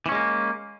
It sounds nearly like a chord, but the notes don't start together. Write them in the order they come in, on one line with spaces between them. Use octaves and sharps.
E3 C#4 G#3 A#3